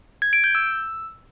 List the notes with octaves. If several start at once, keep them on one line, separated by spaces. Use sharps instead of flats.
G#6
D7
G6
E6